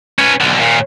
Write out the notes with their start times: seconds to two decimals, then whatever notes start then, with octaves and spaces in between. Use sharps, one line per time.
0.19 C#4 B4
0.41 B1 D3
0.59 D#2 A#2